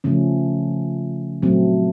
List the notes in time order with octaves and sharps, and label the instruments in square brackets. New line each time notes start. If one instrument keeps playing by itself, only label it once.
[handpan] C#3 F3 A3 C#4
A#2 F#3 A3 C4